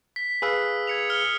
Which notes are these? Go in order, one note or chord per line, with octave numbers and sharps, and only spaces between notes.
B6
G#4 B4 F5 D#6 E6
G#6 C#7 F7
F6 C#7 G7